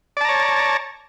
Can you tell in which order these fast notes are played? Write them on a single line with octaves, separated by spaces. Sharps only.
D5 A5 A#5 C#5